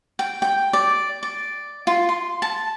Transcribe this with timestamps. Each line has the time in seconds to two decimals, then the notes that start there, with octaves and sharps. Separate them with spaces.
0.19 G5
0.42 G5
0.73 D5
1.23 D5
1.87 F4
2.09 C6
2.42 A5